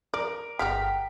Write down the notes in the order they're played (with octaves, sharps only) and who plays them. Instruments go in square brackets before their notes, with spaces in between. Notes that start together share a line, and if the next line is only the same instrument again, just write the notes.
[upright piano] A#4 [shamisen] D5
[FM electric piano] G1 F6 B6 [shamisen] G3 G#3 F#4 [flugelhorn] G5